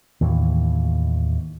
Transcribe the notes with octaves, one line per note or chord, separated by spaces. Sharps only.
D#2 A2 E3